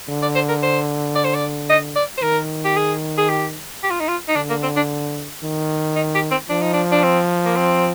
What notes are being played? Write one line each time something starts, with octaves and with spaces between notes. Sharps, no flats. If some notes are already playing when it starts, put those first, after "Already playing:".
D3
D5
C5
A#4
C5
D5
C5
D5
D#5
D5
C5
D#3 A#4
G4
G#4
G#4
G4
G4
F4
D#4
F4
D#4
D3 D4
A#3
C4
D4
D#3
D#4
G4
C4
F3 D4
D#4
D4
D4
C4
A#3
C4